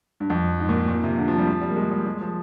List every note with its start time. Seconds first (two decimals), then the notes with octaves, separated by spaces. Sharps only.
0.20 G2
0.30 F2
0.60 G#2
0.69 A#2
0.88 A#2
1.04 C3
1.18 D3
1.28 F3
1.38 G3
1.47 F3
1.61 G3
1.70 A#3
1.76 G#3
1.91 G3
2.06 G#3
2.21 F3